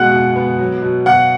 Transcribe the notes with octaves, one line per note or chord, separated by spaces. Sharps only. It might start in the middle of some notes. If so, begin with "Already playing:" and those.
Already playing: B2 G#3 F#5 F#6
B2
B3
F#3
B2
B2 F#5 F#6